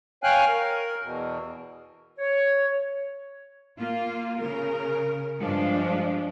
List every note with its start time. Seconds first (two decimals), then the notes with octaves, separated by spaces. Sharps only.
0.23 C#5 F5 G5 G#5 F6 F#6
0.48 A#4
1.02 E2 B2
2.19 C#5
3.78 A#3 F4
4.39 C#3 A#4
5.39 G2 F3 G#3 D4